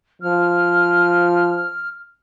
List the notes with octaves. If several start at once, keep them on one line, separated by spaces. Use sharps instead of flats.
F3 F6